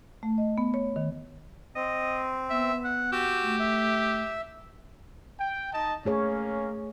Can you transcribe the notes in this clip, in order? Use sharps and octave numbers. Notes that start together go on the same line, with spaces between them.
A3
D#5
B3
C#5
D#3
C4 D#5
B3 E5
F#5
F#4 G4 E6
A3
E5
G5
D#4 D#5 A5
A3 A#3 C#4 G#4 C#5